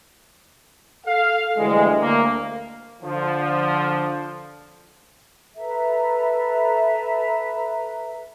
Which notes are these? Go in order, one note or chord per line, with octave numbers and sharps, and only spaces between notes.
A4 F5
D2 E3 G3 G#3
D2 A#3
D3 F3
A4 B4 E5 A#5